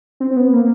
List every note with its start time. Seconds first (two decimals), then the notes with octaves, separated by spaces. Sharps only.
0.20 C4
0.31 C4
0.36 B3
0.53 A#3